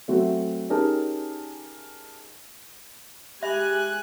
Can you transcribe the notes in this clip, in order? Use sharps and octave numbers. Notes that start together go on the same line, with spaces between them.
F#3 A3 C4 F#4
C#4 D#4 G4 G#4 A#4 A5
G#3 G4 E5 G#5 B5 F#6